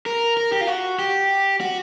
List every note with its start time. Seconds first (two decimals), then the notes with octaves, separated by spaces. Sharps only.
0.06 A#4
0.37 A#4
0.52 G4
0.61 F4
0.67 F#4
0.99 G4
1.61 F#4